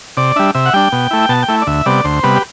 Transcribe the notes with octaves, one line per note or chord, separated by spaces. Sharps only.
C3 D5
G3 D4 E5
C3 E5
F#5
G3 D4 G5
B2
A3 E4
B2 A5
G5
A3 E4
D5
D2 E5
C3 G3 B3 D5
D2 C5
C3 G3 B3 B4
G4